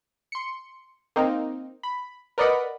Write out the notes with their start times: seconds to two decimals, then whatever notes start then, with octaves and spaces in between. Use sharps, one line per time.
0.32 C6 C#7
1.16 A#3 C4 D#4
1.83 B5
2.38 A#4 B4 D5 D#5 F#5 B5